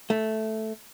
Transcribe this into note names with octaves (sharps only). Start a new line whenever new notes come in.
A3